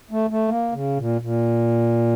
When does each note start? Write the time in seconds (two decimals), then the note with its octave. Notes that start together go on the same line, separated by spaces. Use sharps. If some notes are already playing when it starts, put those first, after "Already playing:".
0.11 A3
0.30 A3
0.48 A#3
0.72 C#3
0.98 A#2
1.21 A#2